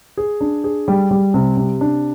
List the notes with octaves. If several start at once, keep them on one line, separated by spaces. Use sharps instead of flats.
G#4
D4
G#4
G3
G3
C3
C3
D4